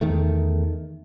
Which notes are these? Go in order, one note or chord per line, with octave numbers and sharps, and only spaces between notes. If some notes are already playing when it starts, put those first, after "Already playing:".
E2 D#3 A3